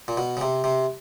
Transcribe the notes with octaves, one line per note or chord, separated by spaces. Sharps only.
A#2
B2
C#3
C3
C3